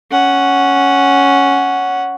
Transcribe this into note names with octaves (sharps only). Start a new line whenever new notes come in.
C#4 F#5